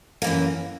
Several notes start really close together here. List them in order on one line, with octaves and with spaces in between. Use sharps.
A#3 E3 F#2